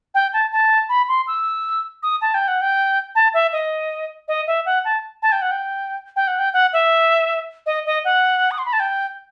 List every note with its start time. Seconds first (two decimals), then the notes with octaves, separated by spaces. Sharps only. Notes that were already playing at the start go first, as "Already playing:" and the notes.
0.14 G5
0.33 A5
0.52 A5
0.89 B5
1.08 C6
1.27 E6
2.03 D#6
2.21 A5
2.34 G5
2.48 F#5
2.61 G5
3.15 A5
3.34 E5
3.53 D#5
4.28 D#5
4.47 E5
4.66 F#5
4.85 A5
5.22 A5
5.32 G5
5.42 F#5
5.51 G5
6.16 G5
6.27 F#5
6.39 G5
6.53 F#5
6.73 E5
7.66 D#5
7.86 D#5
8.05 F#5
8.51 D#6
8.58 C6
8.65 B5
8.73 A5
8.80 G5